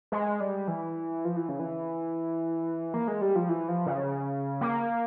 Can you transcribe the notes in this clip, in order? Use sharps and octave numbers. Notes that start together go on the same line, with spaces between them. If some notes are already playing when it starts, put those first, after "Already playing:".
G#3
G3
E3
F3
E3
C#3
E3
A#3
G#3
G3
F3
E3
F3
C#3
A#3